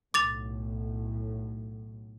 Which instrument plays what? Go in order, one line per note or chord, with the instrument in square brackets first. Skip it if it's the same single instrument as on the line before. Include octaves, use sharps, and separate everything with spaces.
[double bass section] B1 A2 [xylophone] D6 A6 F7